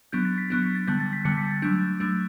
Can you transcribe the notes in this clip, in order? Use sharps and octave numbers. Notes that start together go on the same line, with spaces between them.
F#3 B3 D4 G6
A6
B6
F#3 B3 D4
B6
A6
D3 G3 B3 G6
A6
B6
D3 G3 B3 C#7
A6
B6
A6
F#3 A3 D4 G6
F#3 A3 D4